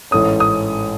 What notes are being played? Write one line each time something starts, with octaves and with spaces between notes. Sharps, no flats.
A1 G#2 E3 A3 C#4 D#6
D#6